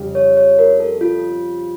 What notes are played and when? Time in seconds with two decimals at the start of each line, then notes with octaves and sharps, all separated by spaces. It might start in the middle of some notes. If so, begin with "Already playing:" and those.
Already playing: F2 C#3 G3
0.15 C#5
0.37 C#5
0.59 A#4
0.80 A4
1.01 F4